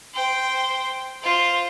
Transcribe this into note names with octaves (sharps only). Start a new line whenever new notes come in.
C5 G5
F4 C5